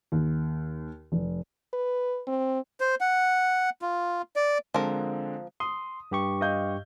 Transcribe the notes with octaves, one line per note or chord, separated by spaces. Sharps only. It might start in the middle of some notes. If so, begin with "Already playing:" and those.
D#2
F1
B4
C4
C5
F#5
F4
D5
D3 F3 G#3 C4 A#4
C6 D#6
G2 G4 C#6
D#5 F5 G6